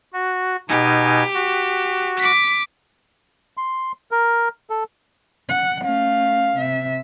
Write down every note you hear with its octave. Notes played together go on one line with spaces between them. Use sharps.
F#4
B2 D#4 G4 G#5
F#4
D6 B6
C6
A#4
A4
F#5
A3 C#4 F5
C3 E5